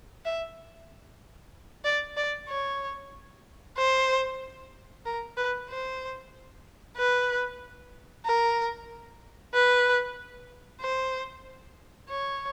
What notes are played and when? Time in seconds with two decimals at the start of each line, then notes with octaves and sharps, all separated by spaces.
0.25 E5
1.85 D5
2.17 D5
2.49 C#5
3.78 C5
5.06 A#4
5.37 B4
5.69 C5
6.97 B4
8.26 A#4
9.54 B4
10.81 C5
12.09 C#5